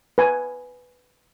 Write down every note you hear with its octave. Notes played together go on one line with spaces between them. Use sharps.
B4 G#5